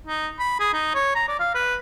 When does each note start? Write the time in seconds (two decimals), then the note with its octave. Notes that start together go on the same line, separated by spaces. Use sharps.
0.07 D#4
0.40 B5
0.60 G#4
0.73 D#4
0.95 C#5
1.15 A#5
1.28 D5
1.40 F5
1.55 B4